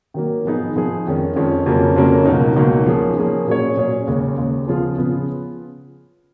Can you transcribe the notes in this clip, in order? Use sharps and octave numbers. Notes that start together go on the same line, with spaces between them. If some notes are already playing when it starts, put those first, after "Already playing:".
D#3 F#3 A#3
F3 B3 D#4 G#4
F3 B3 D#4 G#4
F2 D#3 G#3 C#4
F2 D#3 G#3 C#4
F2 C#3 F#3 A#3 C#4
F2 C#3 F#3 A#3 C#4
C#2 B2 F#3 A#3 D#4
C#2 B2 F#3 A#3 D#4
F3 A#3 C#4 G#4
F3 A#3 C#4 G#4
A#2 F#3 C#4 G#4 C#5
A#2 F#3 C#4 G#4 C#5
D#2 C#3 G#3
D#2 C#3 G#3
C#3 F3 B3 F4 G#4
C#3 F3 B3 F4 G#4